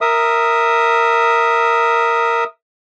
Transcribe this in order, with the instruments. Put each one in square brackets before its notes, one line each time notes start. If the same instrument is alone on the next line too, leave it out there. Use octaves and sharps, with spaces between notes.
[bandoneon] A#4 E5 D#6